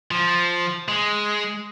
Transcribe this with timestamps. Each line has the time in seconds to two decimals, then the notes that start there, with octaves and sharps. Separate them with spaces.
0.11 F3
0.88 G#3